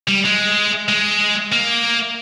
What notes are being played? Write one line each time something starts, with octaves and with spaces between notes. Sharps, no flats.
G3
G#3
G#3
A#3